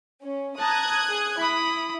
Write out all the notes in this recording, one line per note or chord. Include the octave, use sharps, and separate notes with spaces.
C#4
A5 A#5 D#6 F#6 G#6
G#4
E4 B5 D#6